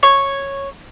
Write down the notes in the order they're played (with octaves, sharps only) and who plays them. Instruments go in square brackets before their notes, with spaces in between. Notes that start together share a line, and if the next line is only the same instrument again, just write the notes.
[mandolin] C#5